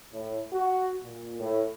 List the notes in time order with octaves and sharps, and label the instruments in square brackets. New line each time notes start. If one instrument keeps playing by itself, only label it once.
[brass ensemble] A2
F#4
A#2
A2